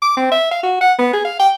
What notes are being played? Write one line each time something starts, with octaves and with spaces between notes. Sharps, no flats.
D6
C4
E5
F5
F#4
F#5
B3
G#4
F5
G5